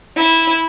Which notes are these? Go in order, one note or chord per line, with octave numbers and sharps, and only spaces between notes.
E4